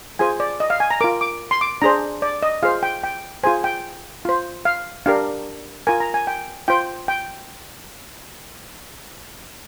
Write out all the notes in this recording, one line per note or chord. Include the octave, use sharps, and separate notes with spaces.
F4 G#4 C5 G#5
D5
D#5
F5
G#5
A#5
F4 A#4 D6
D6
C6
D6
D4 G#4 C5 A#5
D5
D#5
F4 G#4 C5 F5
G5
G5
F4 G#4 C5 G#5
G5
F4 C5
F5
D4 G4 A#4 F5
F4 A#4 G#5
A#5
G#5
G5
F4 C5 G5
G5